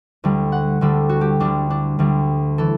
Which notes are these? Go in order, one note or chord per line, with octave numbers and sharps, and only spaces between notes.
D2 D3 G3
F#5
D2 D3 G3 A4
F#4
G4
D2 D3 G3 D4
D4
D2 D3 G3
E3 A4